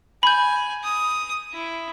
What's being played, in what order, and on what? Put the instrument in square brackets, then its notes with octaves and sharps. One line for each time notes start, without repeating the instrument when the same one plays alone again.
[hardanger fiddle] G#5 [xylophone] B5 G6
[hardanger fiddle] D#6
E4